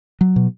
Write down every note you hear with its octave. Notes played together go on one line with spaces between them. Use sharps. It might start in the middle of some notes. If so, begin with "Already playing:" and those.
F#3
B2